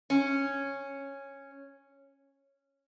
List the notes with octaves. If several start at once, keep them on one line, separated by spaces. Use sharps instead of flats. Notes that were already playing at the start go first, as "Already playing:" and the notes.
C#4